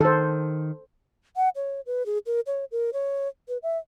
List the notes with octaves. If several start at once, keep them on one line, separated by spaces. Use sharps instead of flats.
D#3 A4 C5
F#5
C#5
B4
G#4
A#4
C#5
A#4
C#5
B4
E5